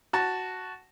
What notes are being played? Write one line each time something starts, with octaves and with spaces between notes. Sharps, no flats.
F#4 A5